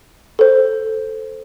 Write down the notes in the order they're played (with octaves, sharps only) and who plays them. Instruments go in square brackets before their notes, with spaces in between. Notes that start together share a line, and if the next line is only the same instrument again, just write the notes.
[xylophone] A4 C5